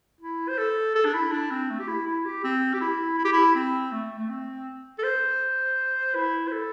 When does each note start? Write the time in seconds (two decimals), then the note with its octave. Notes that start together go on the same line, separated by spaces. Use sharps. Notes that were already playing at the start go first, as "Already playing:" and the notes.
0.21 E4
0.49 C5
0.58 A4
0.95 A4
1.05 D4
1.14 E4
1.32 D4
1.51 C4
1.70 A3
1.80 G4
1.88 E4
2.06 E4
2.25 G4
2.44 C4
2.74 G4
2.81 E4
3.18 E4
3.25 G4
3.33 E4
3.55 C4
3.92 A3
4.19 A3
4.29 C4
4.99 A4
5.04 C5
6.15 E4
6.48 C5
6.52 A4